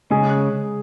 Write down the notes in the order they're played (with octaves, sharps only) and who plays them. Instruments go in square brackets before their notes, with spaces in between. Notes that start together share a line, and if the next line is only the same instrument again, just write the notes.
[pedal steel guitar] C#3 [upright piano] G#3 G#4